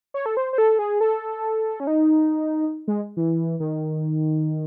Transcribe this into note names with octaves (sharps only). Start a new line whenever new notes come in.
C#5
A4
C5
C5
A4
G#4
A4
C#4
D#4
G#3
E3
D#3